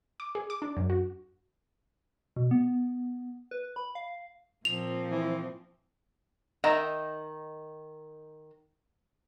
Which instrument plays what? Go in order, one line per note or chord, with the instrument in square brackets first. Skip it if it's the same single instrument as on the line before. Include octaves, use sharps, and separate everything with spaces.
[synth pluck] D6
G#4
D6
D4
F#2
F#4
[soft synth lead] B2
B3
B4
B5
F5
[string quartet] A#2 F3 C4 [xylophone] F7
[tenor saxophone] E3
[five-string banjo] D#3 D#4 E5 A#5